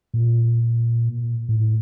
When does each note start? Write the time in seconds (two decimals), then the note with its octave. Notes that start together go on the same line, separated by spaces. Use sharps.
0.14 A#2
1.49 A2